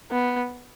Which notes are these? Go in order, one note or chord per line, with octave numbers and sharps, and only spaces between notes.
B3